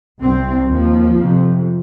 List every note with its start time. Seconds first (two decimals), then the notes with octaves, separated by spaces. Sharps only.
0.21 C2 C3 C4
0.69 D#2 F3
1.17 F2 C3